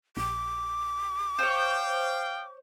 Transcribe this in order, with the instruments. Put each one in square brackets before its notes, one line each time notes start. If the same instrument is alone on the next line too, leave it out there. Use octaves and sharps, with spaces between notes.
[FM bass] A#1 [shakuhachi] D6
[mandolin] C5 C#5 [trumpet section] F5 G5